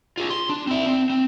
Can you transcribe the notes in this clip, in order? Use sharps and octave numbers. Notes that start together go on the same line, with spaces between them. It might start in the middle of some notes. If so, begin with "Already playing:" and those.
F4 G#4
C6
D4
C4 E4
C4
C4